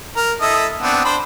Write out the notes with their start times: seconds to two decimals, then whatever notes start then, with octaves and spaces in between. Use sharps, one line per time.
0.17 A#4
0.41 E4 A4 D#5
0.82 B3 C4 D4
1.04 D4 C5 B5